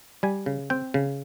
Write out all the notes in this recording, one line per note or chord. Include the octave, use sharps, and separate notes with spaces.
G3 G#5
C#3
C4 G5
C#3